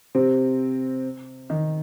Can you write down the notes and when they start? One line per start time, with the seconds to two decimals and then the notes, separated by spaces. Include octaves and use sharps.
0.15 C3 C4
1.50 D#3 D#4